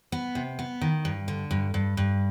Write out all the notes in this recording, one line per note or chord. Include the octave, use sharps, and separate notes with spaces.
B3
C3
B3
D#3
G2
D3
G2
G2
G2